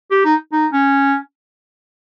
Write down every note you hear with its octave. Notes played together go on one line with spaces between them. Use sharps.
G4
D#4
D#4
C#4